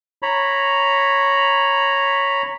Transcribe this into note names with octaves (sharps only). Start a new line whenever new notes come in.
C#5 A#5 B5